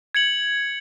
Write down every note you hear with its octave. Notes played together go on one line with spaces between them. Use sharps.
G#6 C#7 F#7